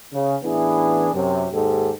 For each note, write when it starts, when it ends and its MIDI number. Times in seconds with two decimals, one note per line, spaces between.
0.13 0.36 49
0.43 1.09 33
0.43 1.09 52
0.43 1.09 59
0.43 1.09 62
0.43 1.09 64
0.43 1.09 68
1.14 1.47 42
1.14 1.47 48
1.14 1.47 54
1.53 1.92 39
1.53 1.92 44
1.53 1.92 67
1.53 1.92 69